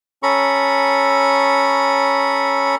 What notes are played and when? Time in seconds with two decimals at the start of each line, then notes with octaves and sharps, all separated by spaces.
0.23 C#4 A4 A#5 B5 C#6